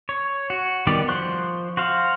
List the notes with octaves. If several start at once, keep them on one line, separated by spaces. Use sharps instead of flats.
C#5
F#4
D#3 G3 B3 G4 D5
F3 C5 C#6 F#6
F#4 C5 F5